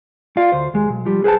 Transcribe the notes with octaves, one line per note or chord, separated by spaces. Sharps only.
F4 D5 F5
D2 C5
D#2 G#3
B1
F3 G3
G#4 B4 C5 F5 A5